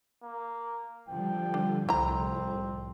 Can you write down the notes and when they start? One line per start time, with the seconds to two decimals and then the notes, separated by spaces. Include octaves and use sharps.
0.23 A#3
1.09 D3 F3 G3 G5
1.54 D4
1.89 C2 F2 A2 C4 E4 A#5